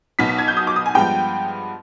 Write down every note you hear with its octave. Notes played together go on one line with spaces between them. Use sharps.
B1 B2 B3 D#4 B6
B6
G#6
G6
D#6
D6
D#6
G#5
G2 F3 G#3 B3 G5